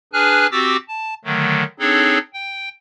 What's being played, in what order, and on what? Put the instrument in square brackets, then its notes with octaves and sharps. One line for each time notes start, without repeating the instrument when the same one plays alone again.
[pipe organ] D4 G#4 B4 G#5 F6 F#6
C4 F#4 G4 D6 E6 A6
A5
D3 D#3 F#3 A3
C4 D4 D#4 G#4 A4 C#5
G5